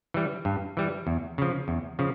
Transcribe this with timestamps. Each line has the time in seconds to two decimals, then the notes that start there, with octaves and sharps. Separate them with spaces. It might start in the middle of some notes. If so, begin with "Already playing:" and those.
0.14 E3 G3
0.45 G2
0.77 E3 G3
1.07 E2
1.38 C#3 F3
1.68 E2
1.99 C#3 F3